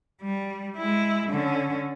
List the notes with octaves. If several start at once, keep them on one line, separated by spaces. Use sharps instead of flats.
G3
G#3 E4
D3 C#4